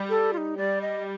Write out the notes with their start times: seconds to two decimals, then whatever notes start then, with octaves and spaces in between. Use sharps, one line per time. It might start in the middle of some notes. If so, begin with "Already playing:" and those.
Already playing: G3
0.09 A4
0.33 F4
0.37 D#4
0.57 G3 D5
0.81 D#5